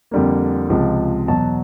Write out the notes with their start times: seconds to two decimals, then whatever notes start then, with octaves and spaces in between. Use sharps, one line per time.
0.11 F2 D3 G3 A#3
0.70 C#2 C3 F3 G#3
1.27 E2 B2 F#3 A5